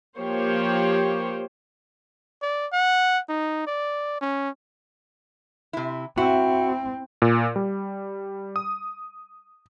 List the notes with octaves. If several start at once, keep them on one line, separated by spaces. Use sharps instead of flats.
F3 A#3 G4 C5 C#5 G5
D5
F#5
D#4
D5
C#4
C3 E4
C4 E4 F#4
A#2
G3
D#6